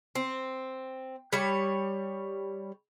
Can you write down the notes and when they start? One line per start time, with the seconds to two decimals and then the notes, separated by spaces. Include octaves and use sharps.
0.15 C4
1.33 G3 C#5